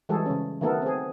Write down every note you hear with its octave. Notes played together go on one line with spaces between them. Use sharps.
E3 G3 G#3 F#4 G#4 A4
C#3 C#4
D#3 F#3 A3 B3 A4 A#4
C4 G#4